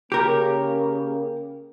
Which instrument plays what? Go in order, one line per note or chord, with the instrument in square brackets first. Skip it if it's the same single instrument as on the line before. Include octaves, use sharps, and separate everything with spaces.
[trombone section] C#3 A#3 [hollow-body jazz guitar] G4 A#4